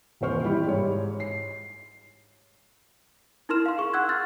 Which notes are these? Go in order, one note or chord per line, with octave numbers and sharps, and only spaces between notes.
D#1 C3 E3 C5 C#6 F6
G3 E4 G4
G#2 C#5
C7
D#4 E4 A#4 C6 F6 E7
F5 C6
G#4 C#6
F#5 E6 F#6 G#6
C6 F6 F#6 A6